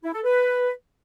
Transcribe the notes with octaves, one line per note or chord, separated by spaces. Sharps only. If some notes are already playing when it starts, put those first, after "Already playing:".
E4
A4
B4